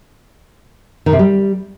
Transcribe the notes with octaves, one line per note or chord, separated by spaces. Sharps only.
D#3
C3
G3